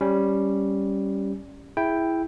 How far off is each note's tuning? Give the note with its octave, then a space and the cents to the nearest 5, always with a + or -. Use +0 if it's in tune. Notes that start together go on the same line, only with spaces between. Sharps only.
G3 +0 C#4 +0
E4 +0 G#4 +0 G5 +0